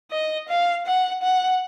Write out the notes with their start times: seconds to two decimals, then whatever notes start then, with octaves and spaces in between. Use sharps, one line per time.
0.11 D#5
0.49 F5
0.86 F#5
1.22 F#5